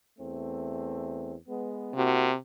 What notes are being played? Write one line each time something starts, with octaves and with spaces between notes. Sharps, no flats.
E2 A3 C4
G#3 B3
C3 A#3 E4 F#4